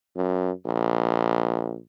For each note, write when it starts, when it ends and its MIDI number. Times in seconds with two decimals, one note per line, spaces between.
0.16 0.52 42
0.65 1.78 34